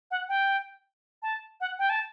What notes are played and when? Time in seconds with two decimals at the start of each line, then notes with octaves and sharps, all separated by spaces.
0.11 F#5
0.29 G5
1.23 A5
1.61 F#5
1.79 G5
1.90 A5